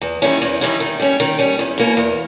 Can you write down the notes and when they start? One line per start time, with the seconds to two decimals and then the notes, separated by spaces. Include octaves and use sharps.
0.02 E2
0.22 D#3 G3 C#4 E4
0.42 E2
0.61 D#3 G3 C#4 E4
0.80 D#3
1.00 G3 C#4
1.20 D#3
1.39 G3 C#4
1.59 E2
1.78 B2 A#3 C#4
1.97 E2